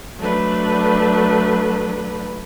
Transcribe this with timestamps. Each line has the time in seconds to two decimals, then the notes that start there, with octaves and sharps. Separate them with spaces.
0.18 F#3 A3 D4 B4